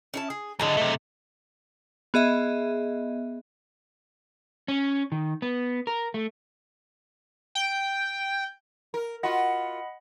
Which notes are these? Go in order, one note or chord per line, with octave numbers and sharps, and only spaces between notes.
C#4 E4 A5
G#4
C#2 D3 F#3 G#3 E4
C3 A3
B3 G#4 D#5 E5
C#4
D#3
B3
A#4
A3
G5
A#4
F4 F#4 D#5 F#5 B5